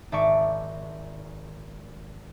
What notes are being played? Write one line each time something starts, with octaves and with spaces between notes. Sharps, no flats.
G#1 D5 E5 A5 C#6 D6